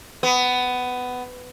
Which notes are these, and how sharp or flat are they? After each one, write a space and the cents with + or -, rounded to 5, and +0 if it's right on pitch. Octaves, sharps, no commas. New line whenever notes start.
B3 +15